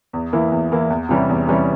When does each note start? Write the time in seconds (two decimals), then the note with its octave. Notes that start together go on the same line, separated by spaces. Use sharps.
0.13 E2
0.33 E3 A#3 E4
0.52 E2
0.72 E3 A#3 E4
0.90 E2
1.09 C3 E3 G3 C#4
1.29 E2
1.47 C3 E3 G3 C#4